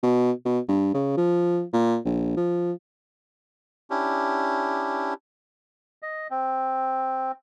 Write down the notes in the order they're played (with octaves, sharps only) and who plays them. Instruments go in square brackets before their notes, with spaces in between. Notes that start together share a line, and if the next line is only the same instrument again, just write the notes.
[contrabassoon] B2
B2
G2
C#3
F3
A#2
A#1
F3
[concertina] C#4 D4 E4 G4
D#5
C4